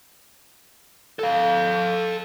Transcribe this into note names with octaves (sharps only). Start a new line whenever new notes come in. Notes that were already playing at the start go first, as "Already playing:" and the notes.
A4 F5